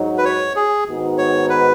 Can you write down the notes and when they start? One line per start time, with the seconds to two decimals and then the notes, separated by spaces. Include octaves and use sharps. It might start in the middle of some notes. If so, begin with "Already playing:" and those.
Already playing: G#2 F#3 D#4 F#4
0.18 B4
0.25 C#5
0.56 G#4
0.87 G#2 D#3 B3 D#4 F#4
1.18 C#5
1.49 B4